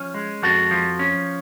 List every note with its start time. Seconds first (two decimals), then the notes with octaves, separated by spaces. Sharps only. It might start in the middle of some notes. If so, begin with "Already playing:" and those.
Already playing: F3 C#4
0.14 G#3
0.43 F2 F#4 A4
0.71 F3
0.99 C#4